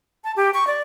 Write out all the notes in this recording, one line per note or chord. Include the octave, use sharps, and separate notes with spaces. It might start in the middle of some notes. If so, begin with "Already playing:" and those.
A5
G4
C#6
D5